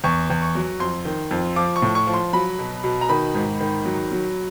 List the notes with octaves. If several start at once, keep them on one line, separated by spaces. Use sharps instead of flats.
E2 C#6
E2
C#6
F#3
F2 C6
D#3
F2
F3 D6
C#6
A2
C#6
F3
C6
F#3 B5
B2
B2
A#5
D#3 B5
G#2
D#3
F#3
F#3